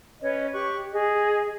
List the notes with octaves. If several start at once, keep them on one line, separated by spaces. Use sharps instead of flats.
C#4 B4 C#5 D#5
G4 C#6 F#6
G#4 D#5